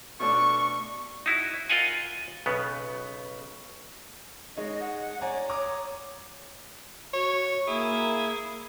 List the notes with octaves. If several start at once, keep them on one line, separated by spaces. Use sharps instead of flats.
B2 A3 D4 C#6
D#4 E4 F#4
F4 A#4 D#5 F5 F#5 G#5
B1 C#3 B3
G#3 D#4 C#5 D#5
F#5
C#5 D5 G#5 A#5
C#5 A#5 D6 D#6
F#4 C#5
A#3 E4 G#4